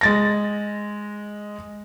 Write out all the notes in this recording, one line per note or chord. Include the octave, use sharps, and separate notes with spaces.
G#3 A6 A#6